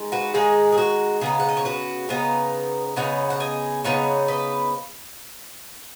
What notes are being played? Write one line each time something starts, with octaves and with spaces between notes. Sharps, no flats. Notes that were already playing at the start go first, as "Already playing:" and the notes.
Already playing: D#3 G#3
F#4 B4
D#3 G#3 D#4 G#4
G#4
F#4
C#3 B3 D#4 G#4
F#5
D#5
C#5
F#4 B4
C#3 B3 D#4
C#3 B3 D#4 C#5 F#5
F#5
D#5 G#5
C#3 B3 D#4 C#5 F#5
B4 D#5